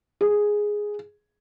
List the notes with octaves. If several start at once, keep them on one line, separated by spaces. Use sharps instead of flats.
G#4